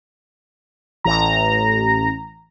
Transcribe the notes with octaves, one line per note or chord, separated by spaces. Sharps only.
A1 A#5